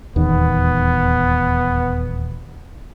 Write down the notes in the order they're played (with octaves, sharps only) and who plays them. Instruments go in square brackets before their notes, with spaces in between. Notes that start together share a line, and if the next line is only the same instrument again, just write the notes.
[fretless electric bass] D#1 E2 D#3 [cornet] B3